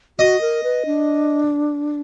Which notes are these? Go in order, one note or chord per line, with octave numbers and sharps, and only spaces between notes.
F#4 D#5
A#4
B4
D4